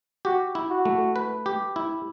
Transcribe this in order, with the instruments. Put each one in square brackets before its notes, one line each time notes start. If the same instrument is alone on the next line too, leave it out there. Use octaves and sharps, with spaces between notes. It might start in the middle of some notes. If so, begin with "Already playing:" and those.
[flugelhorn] F#4 [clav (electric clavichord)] G4
[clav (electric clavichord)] E4
[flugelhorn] F#4
[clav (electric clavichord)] A3
B4
G4
E4